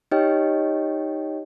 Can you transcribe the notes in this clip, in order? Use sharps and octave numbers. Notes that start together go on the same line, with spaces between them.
D#4 G4 C#5 D#5 G5